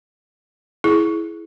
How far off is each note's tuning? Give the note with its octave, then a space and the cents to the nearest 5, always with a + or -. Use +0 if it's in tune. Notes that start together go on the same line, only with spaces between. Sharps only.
E4 +0 G#4 +20